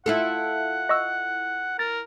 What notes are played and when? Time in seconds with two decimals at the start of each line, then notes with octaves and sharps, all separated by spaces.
0.06 E4 F4 A4 F#5
0.89 D#5 C#6 E6
1.79 A#4 A6